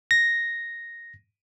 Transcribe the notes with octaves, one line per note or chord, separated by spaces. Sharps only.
A#6